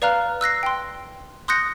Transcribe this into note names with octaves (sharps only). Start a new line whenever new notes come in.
B4 D5 F5 A#5 F6 F#6
E6 F#6 A#6 C7
G5 C6
C6 D#6 F#6 G6 A#6 C#7